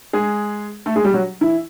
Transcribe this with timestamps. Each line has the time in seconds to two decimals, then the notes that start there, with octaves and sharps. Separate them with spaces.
0.13 G#3 G#4
0.86 A3 A4
0.96 G#3 G#4
1.04 G3 G4
1.14 F#3 F#4
1.41 E3 E4